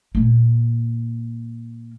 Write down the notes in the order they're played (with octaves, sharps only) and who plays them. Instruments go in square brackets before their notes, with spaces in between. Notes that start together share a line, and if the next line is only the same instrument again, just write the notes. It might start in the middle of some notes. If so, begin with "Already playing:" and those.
[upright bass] A#2 A#3